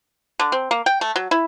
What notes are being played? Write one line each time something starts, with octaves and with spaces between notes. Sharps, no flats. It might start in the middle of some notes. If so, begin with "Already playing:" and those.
D3
C4
A#3
G5
A3
F#3
E4